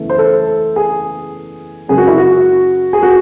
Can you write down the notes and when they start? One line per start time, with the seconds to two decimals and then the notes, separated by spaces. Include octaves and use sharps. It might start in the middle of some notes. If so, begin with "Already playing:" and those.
Already playing: F#1 E2 C#3 E3 A3
0.10 C5
0.19 A4
0.76 G#4
1.88 F#2 C#3 G#3 G#4
1.98 F#4
2.08 E4
2.18 F#4
2.93 G#4
3.03 F#4